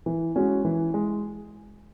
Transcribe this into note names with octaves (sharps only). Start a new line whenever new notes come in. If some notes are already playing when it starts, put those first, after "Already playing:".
E3
G#3 C#4 F#4
E3
G#3